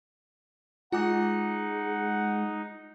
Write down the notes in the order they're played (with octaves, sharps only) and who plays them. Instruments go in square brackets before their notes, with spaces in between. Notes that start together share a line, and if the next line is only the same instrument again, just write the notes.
[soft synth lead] G#3 [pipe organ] D#4 [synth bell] F4 G#5 D6 [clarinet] F#5